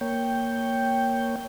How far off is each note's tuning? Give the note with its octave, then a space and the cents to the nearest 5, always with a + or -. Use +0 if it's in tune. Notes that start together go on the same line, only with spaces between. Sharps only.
A#3 +0 C#5 +0 G5 +0